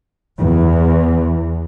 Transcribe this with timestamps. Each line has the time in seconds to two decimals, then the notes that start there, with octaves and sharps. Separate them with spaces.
0.37 E2